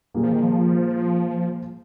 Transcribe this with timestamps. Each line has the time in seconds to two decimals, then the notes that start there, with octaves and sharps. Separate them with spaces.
0.14 A#2 G3 A#3 F4 G#4
0.23 F3
0.32 D#3
0.42 F3